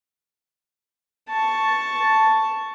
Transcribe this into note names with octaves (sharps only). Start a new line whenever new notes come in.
A5 C#6